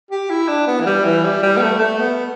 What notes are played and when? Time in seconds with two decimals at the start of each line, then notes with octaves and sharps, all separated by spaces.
0.11 G4
0.30 E4
0.48 D4
0.67 B3
0.81 E3
0.86 G3
1.05 E3
1.24 G3
1.43 G3
1.57 B3
1.61 A3
1.80 A3
1.99 B3